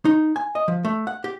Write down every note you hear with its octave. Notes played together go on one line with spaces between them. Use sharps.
D#4
G#5
D#5
F3
A3
F#5
G4